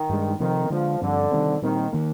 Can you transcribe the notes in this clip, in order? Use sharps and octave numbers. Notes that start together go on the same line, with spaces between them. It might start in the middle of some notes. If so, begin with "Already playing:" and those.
Already playing: D#3
G2 F3 G#3 D4
C3 D#3 F3 C4
D3 F3 G#3 D4
G2 D3 F3 C4
C3 D#3 G3 C4
A#2 D#3 G3 C4
D#3 A#3